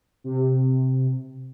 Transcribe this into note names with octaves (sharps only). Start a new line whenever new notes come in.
C3